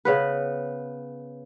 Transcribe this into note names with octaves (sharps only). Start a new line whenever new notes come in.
C#3 B3 B4